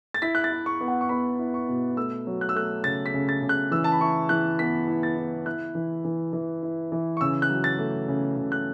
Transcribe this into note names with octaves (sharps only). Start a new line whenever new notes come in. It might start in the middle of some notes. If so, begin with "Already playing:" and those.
A6
E4 B6
F#6
A6
E4
C#6
B3
F#5
C#6
B3 B5
E4
C#6
B2
A3 E6
F#3
F#6
E6
A3 F#6
C#3 A6
B6
C#3
A6
C#3
F#6
E3 E6
A5
B5
E4 C#6
E3 F#6
B3 B6
E4
A6
E4
E4 F#6
E3
E3
E3
E4
E3
C#6
C#3 E6
F#6
F#3
A6
A3
C#3
C#3
F#6